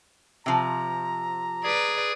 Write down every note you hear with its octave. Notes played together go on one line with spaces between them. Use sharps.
C3 F3 A#5
G#4 B4 D5 G#6